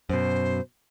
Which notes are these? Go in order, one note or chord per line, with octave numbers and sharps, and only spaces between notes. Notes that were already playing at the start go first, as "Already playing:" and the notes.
F#2 B2 C5